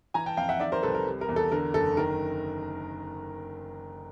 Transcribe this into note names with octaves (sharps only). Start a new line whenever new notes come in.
E3 G#5 A#5
G5 A5
F2 F5 G5
E5 F#5
D#3 D5 E5
A#4 C5
C2 A4 B4
A#4
G3
A#4
E2
A4
D3 A#4
F#1 A4
D#3 A#4